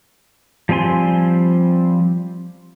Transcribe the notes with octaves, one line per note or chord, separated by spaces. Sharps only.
F3 G3 C4 G#5 C6